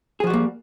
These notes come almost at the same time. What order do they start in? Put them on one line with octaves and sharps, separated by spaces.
G#4 F3 F#4 G3 A#3